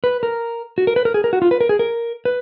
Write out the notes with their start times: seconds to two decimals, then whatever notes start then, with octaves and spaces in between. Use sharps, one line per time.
0.04 B4
0.23 A#4
0.78 F#4
0.87 A#4
0.96 B4
1.05 A#4
1.14 G#4
1.24 A#4
1.33 F#4
1.42 F4
1.51 B4
1.61 A#4
1.69 G#4
1.79 A#4
2.25 B4